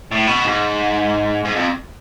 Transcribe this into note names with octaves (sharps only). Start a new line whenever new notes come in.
A2
B2
G#2
G#2
F2